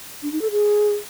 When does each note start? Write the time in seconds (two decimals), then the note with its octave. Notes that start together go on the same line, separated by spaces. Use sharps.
0.23 D4
0.32 D#4
0.42 A4
0.51 G#4